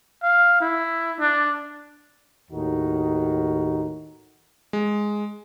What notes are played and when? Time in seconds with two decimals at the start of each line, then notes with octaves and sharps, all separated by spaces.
0.23 F5
0.61 E4
1.19 D4
2.51 D#2 A2 D#3 D#4 F#4
4.73 G#3